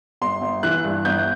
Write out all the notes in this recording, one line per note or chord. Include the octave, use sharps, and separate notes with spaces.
G1 C6
G1
E3 F#6
G2
G1 G6